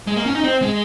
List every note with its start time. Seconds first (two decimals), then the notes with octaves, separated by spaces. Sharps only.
0.07 G#3
0.16 A#3
0.26 C#4
0.35 D#4
0.44 C4
0.62 G#3